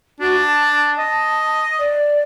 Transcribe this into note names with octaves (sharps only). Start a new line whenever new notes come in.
D4 F#4
A5
D#5
D5